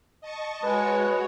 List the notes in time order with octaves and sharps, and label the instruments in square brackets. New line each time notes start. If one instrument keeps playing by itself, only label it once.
[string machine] D#5 A5 C#6
[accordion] G#3 [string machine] F#4 C#5 [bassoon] B4